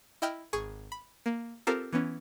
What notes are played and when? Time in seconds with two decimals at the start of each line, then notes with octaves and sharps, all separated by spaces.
0.22 E4 D#5 G5 F6
0.53 G#1 G#4 C#6
0.92 B5
1.26 A#3
1.67 C4 F4 G4 A4 A#4 C5
1.93 E3 B3 C#4